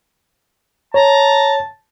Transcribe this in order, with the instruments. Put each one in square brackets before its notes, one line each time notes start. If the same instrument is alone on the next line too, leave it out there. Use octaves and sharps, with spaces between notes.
[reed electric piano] C#5 [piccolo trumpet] A5 [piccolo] A#5